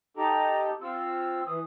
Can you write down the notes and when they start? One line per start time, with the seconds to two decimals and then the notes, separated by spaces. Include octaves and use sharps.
0.17 D#4 G4 A4 A#5
0.82 C4 F4 E6
1.47 E3 D#6